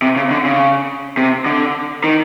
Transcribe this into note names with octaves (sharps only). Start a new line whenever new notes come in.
C3
C#3
D3
C#3
C3
D3
D#3